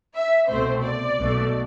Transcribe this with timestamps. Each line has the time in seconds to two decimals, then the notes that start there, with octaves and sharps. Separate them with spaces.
0.15 E5
0.49 C2 B2 A3 C4 C5
0.84 D5
1.18 B1 B2 A3